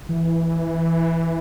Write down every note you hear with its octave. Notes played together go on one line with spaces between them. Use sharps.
E3